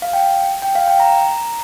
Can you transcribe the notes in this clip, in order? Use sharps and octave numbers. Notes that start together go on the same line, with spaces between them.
F5
G5
G5
F5
G5
A#5